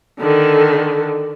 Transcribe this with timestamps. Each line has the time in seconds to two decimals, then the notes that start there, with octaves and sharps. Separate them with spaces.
0.20 D3 D#3